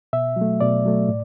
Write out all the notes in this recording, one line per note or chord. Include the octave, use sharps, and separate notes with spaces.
B2 E5
F#3
A3
B2 D5
F#3 A3
A2